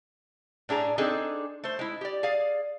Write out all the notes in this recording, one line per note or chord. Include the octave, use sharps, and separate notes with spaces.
A2 D4 G#4 A#5
C4 D4 D#4 G#4 A4
A3 C5
G#3 E4
G4 D5
G#4 D5 F5